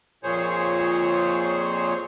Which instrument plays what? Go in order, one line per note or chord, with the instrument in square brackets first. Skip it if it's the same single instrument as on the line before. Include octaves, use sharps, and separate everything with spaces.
[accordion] F2 A#2 G#4 C5 C#5